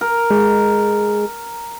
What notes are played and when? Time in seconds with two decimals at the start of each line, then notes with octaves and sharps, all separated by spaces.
0.01 A#4
0.31 G#3